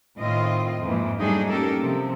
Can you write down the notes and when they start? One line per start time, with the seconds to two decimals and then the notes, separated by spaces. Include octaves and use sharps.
0.18 A2 D#3 C4 F4 D#5
0.83 F2 G#2 E3 A#3
1.20 F#3 G3 A3 D4 D#4 G#4
1.50 A#3 C#4 D#4 G4 A4 A#4
1.81 C3 F3